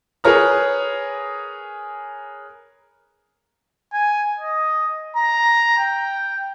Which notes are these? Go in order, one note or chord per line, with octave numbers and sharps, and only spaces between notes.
G#4 A#4 B4 C#5 A#5 F6
G#5
D#5
A#5
G5